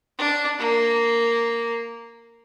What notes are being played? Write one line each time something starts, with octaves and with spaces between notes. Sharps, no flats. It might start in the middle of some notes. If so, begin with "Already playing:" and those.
D4
A#3